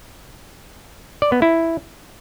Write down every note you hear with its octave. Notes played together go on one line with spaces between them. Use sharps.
D5
B3
E4